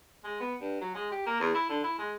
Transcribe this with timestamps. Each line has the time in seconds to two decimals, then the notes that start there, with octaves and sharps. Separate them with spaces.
0.24 G#3
0.40 B3
0.61 G2
0.81 F#3
0.95 G#3
1.12 G4
1.26 A#3
1.40 E2
1.54 E4
1.69 D3
1.84 E4
1.99 G#3